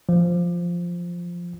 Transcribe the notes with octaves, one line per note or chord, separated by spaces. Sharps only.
F3